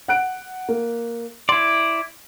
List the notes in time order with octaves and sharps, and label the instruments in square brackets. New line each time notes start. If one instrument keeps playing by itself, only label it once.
[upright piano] F#5 F#6 D7
A#3
[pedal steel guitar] E4 D5 [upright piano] C6